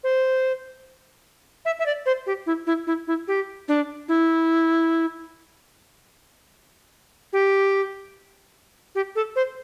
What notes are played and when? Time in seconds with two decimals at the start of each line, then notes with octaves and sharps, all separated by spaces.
0.04 C5
1.65 E5
1.79 E5
1.86 D5
2.06 C5
2.26 G4
2.46 E4
2.67 E4
2.87 E4
3.07 E4
3.28 G4
3.68 D4
4.08 E4
7.33 G4
8.95 G4
9.15 A4
9.36 C5